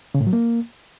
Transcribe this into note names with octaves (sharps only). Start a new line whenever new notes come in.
C#3
A2
F#3
A#3